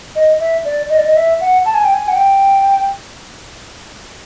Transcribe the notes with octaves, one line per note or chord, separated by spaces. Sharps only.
D#5
E5
D5
D#5
D5
D#5
E5
F#5
A5
G#5
G5
G#5
F#5
G5